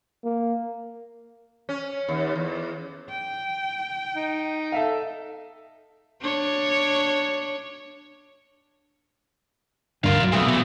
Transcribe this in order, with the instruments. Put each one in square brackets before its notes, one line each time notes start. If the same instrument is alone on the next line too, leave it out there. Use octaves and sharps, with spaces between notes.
[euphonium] A#3
[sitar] C#4
D#2
E2
[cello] G5
[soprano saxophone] D#4
[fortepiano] A4 E5 F5
[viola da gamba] D4 C#5
[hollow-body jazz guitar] C#2 G2 D3 [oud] A#3 F4 [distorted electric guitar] D5 F5
[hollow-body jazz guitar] B1 F#3
[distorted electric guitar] F3 C4 [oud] A3 B3 G#4
[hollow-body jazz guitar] B2 [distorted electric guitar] D3 E3